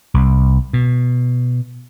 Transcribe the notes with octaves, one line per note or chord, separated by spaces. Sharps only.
C2
B2